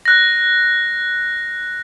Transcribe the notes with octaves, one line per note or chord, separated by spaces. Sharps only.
F#6 A#6